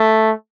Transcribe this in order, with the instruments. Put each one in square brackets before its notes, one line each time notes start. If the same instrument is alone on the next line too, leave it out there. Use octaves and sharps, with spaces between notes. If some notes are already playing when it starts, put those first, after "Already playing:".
Already playing: [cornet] A3